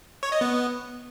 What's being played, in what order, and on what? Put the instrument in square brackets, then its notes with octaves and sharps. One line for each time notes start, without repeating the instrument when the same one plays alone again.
[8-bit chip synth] C#5
D#5
B3